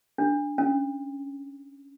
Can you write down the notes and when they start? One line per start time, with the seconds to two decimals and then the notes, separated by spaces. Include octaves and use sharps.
0.18 D4
0.58 C#4